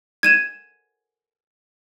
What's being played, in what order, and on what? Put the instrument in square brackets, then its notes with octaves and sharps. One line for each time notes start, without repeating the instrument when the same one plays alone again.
[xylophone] G#6 D#7 E7